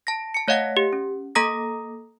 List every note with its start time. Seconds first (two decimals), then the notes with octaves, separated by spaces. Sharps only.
0.07 A5 A#6
0.34 A5 C#7
0.48 A3 C#5 D#5 F5 F#5 A#6
0.77 G4
0.93 C#4
1.35 A#3 A4 A#5 D#6 A#6